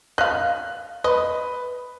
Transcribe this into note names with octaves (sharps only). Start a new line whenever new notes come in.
D#5 F5 F#6
B4 D#5